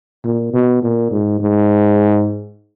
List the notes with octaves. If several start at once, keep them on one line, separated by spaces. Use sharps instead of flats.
A#2
B2
A#2
G#2
G#2